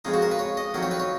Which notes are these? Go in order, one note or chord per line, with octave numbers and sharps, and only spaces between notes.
F2 C#3 G#3 D#4
F#4
A#4
B4
C#5
D#5
F2 D#3 F#3 F#5
C#5
B4
C#5